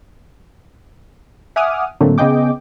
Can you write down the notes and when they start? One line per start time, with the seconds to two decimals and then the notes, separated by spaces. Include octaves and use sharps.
1.56 E5 F#5 G#5 D6 D#6 F6
2.00 A2 D3 F#3 A3 A#3 C4
2.18 C#3 B3 G#4 D#5 G5 D6